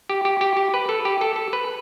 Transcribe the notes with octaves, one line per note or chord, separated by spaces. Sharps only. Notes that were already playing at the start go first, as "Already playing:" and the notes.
G4
G4
G4
G4
B4
A4
G4
A4
A4
B4